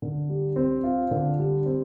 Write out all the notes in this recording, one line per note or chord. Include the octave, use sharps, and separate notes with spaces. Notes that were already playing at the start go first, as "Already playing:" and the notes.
D3
G3
C4
F4
D3
G3
C4